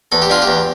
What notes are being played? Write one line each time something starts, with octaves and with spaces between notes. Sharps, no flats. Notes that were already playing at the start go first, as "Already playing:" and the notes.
E2 A4
G4
D3 F4
G4
E2